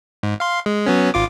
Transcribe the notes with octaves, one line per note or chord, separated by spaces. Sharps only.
G#2
F5 C6
G#3
F#3 B3 C#4
G#1 F4 D6